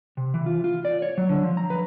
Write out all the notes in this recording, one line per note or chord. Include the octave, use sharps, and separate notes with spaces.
C3
E3
F4
F4
D5
C#5
F#3
D3
F3
A#5
B4